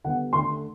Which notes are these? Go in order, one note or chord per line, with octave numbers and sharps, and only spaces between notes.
D3 G3 B3 F#5
D3 A3 C6